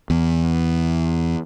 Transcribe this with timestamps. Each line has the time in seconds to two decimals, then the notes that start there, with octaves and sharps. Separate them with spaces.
0.10 E2